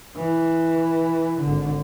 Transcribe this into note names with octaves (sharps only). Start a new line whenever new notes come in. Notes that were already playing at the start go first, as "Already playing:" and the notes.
E3
G#1 D3